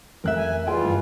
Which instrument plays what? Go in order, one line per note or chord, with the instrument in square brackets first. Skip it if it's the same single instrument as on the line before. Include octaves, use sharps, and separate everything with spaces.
[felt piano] F1 F#6 [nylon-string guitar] A#4 E5
[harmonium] G#5
[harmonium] E3 G3 F4 [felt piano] G#4 D#5 G#5 [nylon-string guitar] G5
[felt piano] G1